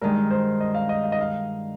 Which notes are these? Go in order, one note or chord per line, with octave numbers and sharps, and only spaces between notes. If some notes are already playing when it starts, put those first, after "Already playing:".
G2 D#3 G#3 A#4
C5
D#5
F5
D#5
F5
D#5
F5